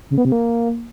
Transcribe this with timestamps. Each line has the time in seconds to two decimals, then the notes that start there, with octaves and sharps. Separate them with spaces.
0.11 C#3
0.18 B3
0.25 C3
0.32 A#3